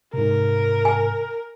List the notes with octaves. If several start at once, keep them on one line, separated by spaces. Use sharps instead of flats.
G#2 C3 A#4
G#5